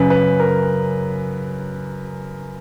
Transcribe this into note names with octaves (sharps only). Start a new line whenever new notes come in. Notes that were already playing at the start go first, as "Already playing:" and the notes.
Already playing: F#2 C#3 B4
B4
A#4